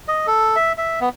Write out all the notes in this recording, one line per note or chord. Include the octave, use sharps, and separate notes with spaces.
D#5
A4
E5
E5
B3